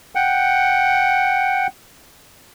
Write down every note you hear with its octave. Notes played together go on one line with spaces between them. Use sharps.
F#5 G5